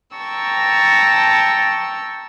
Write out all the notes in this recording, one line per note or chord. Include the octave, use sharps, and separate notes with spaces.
G5 A5 A#5 C#6 E6